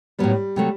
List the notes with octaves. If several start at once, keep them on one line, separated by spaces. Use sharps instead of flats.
A2 F#3 G3 B3
C3 F#3 A3